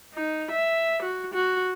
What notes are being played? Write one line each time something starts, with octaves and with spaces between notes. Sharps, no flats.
D#4
E5
F#4
F#4